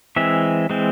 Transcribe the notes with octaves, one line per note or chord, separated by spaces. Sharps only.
E3 G#3 C4 E5
E3 G#3 C4